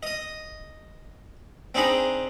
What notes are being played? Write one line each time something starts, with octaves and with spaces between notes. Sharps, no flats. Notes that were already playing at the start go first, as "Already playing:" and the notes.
D#5 D#6
C4 D4 D#4 G#4 B5